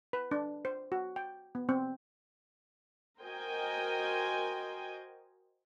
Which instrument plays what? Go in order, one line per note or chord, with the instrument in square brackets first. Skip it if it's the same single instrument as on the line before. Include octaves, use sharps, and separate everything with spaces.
[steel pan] B4
D4
C5
F#4
G5
B3
C4
[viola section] F#4 A#4 C5 D#5 G5 G#5